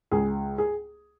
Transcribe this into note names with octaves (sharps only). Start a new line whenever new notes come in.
C#2 G#4
G#4